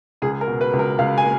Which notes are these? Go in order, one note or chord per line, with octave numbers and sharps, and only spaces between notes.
C#2 G#4
A#4
B2
B4
C#2
A#4
C#2 F5
G#5
A#3